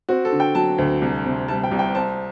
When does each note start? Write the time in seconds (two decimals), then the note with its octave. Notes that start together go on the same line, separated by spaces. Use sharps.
0.09 C4 F#4
0.25 A4
0.32 D3
0.40 G5
0.55 F#3 A5
0.78 D2
1.02 C2
1.25 C3
1.48 G3 A5
1.64 G5
1.71 C2
1.79 G5
1.94 C4 A5